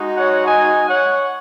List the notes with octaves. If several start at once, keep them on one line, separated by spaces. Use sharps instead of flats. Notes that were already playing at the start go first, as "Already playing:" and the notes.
Already playing: G#3 D#4 F#4
C#5 F#5
D#5 G#5
C#5 F#5